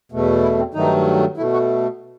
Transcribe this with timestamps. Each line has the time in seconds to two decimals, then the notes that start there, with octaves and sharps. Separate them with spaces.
0.12 E2 B2 A3
0.42 E4
0.59 C4
0.74 G2 D#3 F#3 A3 D#4
1.37 B2 A3 E4
1.53 F#4